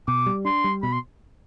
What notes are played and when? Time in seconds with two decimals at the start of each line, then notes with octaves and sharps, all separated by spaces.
0.08 B2 D6
0.26 G3
0.45 D4 C6
0.64 G3
0.83 B2 B5
0.92 C6